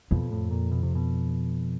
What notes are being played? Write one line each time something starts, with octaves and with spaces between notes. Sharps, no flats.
F2 B2
A2
A#2
B2
C3
B2